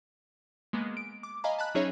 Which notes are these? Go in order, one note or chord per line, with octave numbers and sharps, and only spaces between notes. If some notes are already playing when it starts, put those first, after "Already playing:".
G#3 A#3 B3
D7
D6
D#5 F5 G#5 A#5 B5
A5 B5 F#6
F#3 C#4 D#4 G#4 C#5 E5